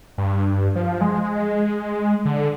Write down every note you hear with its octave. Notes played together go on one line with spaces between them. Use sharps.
G2
F3
G#3
D3